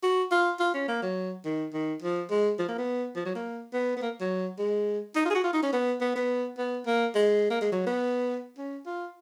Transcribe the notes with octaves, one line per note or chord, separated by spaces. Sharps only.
F#4
F4
F4
C#4
A#3
F#3
D#3
D#3
F3
G#3
F3
A#3
B3
F3
F#3
A#3
B3
B3
A#3
F#3
G#3
D#4
F4
G#4
F#4
F4
D#4
C#4
B3
B3
B3
B3
A#3
G#3
A#3
G#3
F#3
B3
C#4
F4